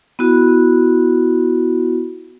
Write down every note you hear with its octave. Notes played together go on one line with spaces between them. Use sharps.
B3 E4 F#4